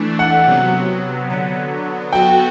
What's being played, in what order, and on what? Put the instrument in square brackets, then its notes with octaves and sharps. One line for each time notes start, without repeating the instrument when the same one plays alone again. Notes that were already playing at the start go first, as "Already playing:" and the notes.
Already playing: [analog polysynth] E3 A3 D4
[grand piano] F#5
[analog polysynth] C3 F#3 B3
D3 F#3 B3
[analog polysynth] B3 F#4 A4 [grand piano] G5